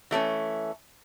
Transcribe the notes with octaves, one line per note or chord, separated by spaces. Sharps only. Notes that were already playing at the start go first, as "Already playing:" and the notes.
E3 A3 C4 C#4